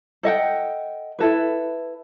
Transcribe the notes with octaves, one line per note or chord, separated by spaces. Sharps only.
A4 D#5 F#5 G5
E4 A4 B4